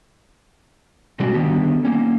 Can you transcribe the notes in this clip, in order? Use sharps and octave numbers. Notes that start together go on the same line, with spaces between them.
B2 G3 G#3 C#4 F#4 G4
D3 D#3 G3 B3 G4
A#3 C#4